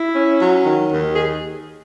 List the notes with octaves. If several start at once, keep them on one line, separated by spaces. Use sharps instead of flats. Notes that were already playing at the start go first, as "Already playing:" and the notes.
Already playing: E4
C#4
F#3
D#3
D#2
D#3 G#4